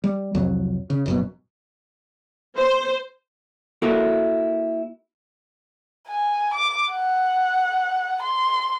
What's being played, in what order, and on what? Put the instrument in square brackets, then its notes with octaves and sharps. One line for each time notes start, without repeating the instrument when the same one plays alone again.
[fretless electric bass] G3
C2 F2 F#3
C#3
F1 F#2 B2
[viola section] C5
[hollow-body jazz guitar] A#3 E4 F#4 A4 A#4
[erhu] G#5
D6
F#5
C6